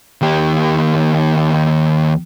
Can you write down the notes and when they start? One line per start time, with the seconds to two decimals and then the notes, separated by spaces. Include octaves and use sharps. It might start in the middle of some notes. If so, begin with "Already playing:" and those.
0.21 D#2 G4